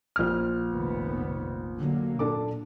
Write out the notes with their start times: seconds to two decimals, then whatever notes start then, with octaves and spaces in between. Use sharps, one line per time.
0.16 A#1 F6
0.68 F1 D#3 B3
1.77 D3 F#3 A#3
2.19 A#2 D4 A4 D6